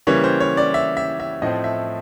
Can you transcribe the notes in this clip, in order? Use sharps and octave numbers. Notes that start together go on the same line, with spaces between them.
C#3 E3 G3 A#3 C#5
C5
C#5
D5
E5
E5
E5
A2 F3 A3 C4 D#5
E5